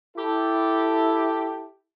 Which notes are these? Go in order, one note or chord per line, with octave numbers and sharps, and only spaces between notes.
E4 G4 A4